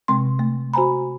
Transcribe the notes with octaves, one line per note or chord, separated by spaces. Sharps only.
C3 G#3 C4 C6
A3
F#4 C5 G#5 A#5 B5